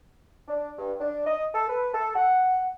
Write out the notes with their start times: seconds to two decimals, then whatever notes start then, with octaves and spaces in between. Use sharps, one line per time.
0.48 D4
0.78 G2
1.01 D4
1.26 D#5
1.54 A4
1.69 B4
1.94 A4
2.15 F#5